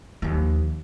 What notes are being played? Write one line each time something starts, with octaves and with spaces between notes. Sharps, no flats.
D#2 F3